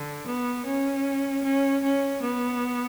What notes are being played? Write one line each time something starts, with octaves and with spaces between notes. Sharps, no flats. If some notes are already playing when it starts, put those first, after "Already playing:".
Already playing: D3
B3
C#4
C#4
C#4
B3